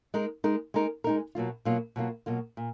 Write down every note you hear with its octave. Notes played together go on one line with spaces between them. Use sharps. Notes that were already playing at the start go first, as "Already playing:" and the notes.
G#3 D#4 A#4
G#3 D#4 A#4
G#3 D#4 A#4
G#3 D#4 A#4
B2 F#3 A#3 F4
B2 F#3 A#3 F4
B2 F#3 A#3 F4
B2 F#3 A#3 F4
A#2